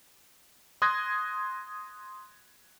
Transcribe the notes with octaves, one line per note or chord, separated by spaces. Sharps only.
C6 D#6 F#6 G#6 A#6